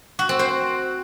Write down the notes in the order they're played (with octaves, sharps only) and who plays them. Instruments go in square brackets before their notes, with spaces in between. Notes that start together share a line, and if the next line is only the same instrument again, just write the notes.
[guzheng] F#4
C4
C5